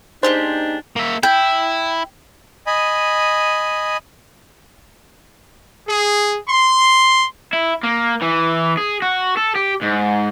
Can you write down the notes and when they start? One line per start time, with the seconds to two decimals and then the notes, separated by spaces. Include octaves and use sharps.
0.23 A#3 D4 D#4 G4 G#4 C5
0.96 A#3 E5
1.23 E4 G5
2.67 D#5 G#5 B5
5.88 G#4
6.47 C6
7.53 E4
7.84 A#3
8.22 E3
8.77 G#4
9.02 F#4
9.37 A4
9.56 G4
9.82 G#2